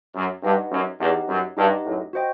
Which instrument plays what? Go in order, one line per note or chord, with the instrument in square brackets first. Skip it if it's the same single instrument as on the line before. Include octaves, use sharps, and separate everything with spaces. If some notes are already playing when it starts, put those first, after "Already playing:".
[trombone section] F#2
[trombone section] G2 [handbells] D#4 G4 B4 D#5 F#5
[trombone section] F#2
[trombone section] E2 [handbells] D#4 G4 B4 D#5 F#5
[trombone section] F#2
[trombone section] G2 [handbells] D#4 G4 B4 D#5 F#5
[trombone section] F#2 A2
[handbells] F#4 C5 D#5 G5